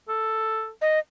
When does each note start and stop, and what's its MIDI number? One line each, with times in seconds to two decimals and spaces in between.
0.09 0.70 69
0.82 0.99 75